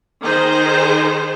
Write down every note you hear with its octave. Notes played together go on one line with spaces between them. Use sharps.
D#3 G#4 C5